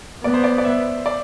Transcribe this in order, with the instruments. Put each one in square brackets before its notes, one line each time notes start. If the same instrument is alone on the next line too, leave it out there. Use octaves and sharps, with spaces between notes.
[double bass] B3 [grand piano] D5
[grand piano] C5
D5
D5
E5
D5